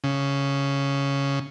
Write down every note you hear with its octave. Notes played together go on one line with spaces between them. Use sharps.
C#3